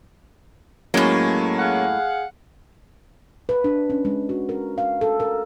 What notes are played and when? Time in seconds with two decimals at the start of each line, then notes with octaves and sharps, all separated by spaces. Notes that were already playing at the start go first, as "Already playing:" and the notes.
0.94 A2 F#3 G#3 A#3 C#4
1.58 G#4 F5 F#5
3.49 B4
3.64 D4
3.90 C#4
4.05 G#3
4.29 F#4
4.49 A#4
4.78 F5
5.01 A4
5.20 A#4